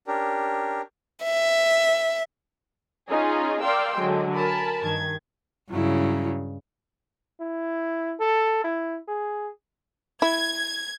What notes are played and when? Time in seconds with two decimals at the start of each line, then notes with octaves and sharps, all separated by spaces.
0.07 C#4 D4 G4 A#4
1.23 E5
3.10 C#4 D#4 F4 G#4
3.60 A#4 D5 F5 G5 C6 E6
3.96 D3 F#3 G#3
4.35 A#4 G#5 A5 B5
4.82 G2 D#3 G#6
5.71 G2 C#3 F#3 E4
7.40 E4
8.20 A4
8.64 E4
9.08 G#4
10.22 E4 G#6